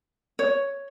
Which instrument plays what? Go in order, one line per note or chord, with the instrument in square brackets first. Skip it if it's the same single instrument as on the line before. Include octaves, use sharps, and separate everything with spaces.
[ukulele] C#5